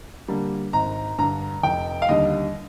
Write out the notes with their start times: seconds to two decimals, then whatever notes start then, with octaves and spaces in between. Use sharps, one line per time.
0.28 D3 G3 A#3
0.73 G#1 A#5
1.18 G2 D3 A#5
1.63 F1 G5
2.02 F5
2.09 D#2 D3 G3 D#5